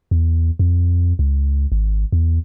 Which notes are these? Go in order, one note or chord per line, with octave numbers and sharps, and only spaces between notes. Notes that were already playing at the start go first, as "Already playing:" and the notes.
E2
F2
C#2
G#1
E2